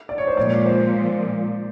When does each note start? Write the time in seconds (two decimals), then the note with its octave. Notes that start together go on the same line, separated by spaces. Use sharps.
0.09 D5
0.18 C#5
0.27 C5
0.37 A#2 F3 G#3 D5
0.66 C5